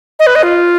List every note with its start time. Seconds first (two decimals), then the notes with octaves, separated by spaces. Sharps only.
0.19 D#5
0.27 B4
0.35 D#5
0.43 F4